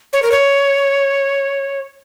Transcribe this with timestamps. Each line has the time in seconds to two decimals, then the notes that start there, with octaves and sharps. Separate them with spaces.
0.13 C#5
0.22 A#4
0.32 C#5